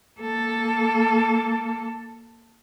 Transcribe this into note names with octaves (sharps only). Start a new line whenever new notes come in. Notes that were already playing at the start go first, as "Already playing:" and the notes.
A#3 A4